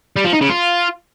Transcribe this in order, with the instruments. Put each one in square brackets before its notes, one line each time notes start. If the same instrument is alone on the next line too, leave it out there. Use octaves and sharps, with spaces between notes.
[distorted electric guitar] G3
F3
D#4
C#3
F4